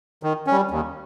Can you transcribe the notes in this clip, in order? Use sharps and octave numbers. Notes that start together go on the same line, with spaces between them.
D#3
G3 C#4
D#2